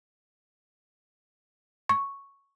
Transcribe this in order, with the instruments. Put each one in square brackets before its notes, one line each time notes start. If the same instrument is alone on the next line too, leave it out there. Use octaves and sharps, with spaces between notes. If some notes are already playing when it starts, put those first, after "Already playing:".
[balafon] C#6